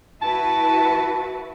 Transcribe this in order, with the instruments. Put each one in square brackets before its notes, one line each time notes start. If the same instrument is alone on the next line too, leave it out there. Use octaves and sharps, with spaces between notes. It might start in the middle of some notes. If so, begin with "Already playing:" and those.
[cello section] E4 F#4 B4 [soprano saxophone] A5